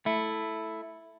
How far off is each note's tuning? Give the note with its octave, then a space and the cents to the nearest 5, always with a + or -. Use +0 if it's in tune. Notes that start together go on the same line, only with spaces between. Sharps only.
A3 +0 E4 +0